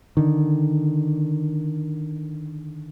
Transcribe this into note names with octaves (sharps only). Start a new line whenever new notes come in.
D3 D#3